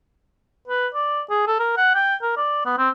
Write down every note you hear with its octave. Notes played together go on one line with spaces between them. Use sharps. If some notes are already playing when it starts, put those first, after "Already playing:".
B4
D5
G#4
A4
A#4
F#5
G5
A#4
D5
B3
C4